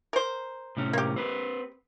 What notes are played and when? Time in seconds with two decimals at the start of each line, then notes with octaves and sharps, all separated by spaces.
0.13 A#4 C5
0.77 A2 C3 C#4
0.93 A#3 G4
1.16 C4 B4